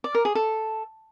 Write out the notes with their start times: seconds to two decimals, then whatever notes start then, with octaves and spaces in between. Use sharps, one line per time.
0.04 D5
0.15 A#4
0.25 G#4
0.35 A4